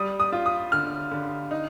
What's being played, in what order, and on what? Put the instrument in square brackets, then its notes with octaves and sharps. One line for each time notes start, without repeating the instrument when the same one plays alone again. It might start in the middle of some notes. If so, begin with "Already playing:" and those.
Already playing: [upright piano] G3 D#6
D#6
F4
D#6
D3 F6
D3
D#4